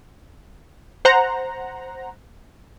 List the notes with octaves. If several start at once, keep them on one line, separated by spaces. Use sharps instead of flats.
C5 F#5 A#5